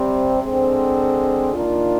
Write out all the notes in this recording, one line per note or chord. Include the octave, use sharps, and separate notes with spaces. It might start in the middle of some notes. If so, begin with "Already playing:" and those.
Already playing: C3 G3 C4
D3 G#3 C4
D#3 A#3 D4 F4